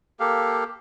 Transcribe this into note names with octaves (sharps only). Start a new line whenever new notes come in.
A#3 G4 A4 F5